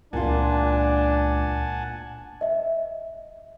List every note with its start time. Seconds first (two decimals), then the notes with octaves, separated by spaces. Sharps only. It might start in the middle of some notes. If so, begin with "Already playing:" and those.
0.13 C#2 A#2 D4 F4 F#5 G#5 A5
2.41 D#5 E5